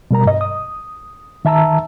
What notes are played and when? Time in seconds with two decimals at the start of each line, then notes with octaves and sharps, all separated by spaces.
0.11 B2 G3 A#4 A#5
0.26 G2 D#5
0.41 D#6
1.45 D#3 E5 A5 A#5 E6